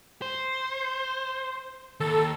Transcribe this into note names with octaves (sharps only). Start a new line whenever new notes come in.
C5
D#2 A4